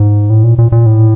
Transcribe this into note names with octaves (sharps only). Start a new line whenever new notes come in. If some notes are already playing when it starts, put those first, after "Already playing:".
Already playing: G#2
A2
A#2
A#2
A#2
A2